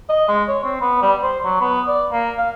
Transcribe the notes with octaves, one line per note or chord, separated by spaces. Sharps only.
D#5
G#3
C#5
C4
B3
G3
C5
F#3
B3
D5
A#3
F5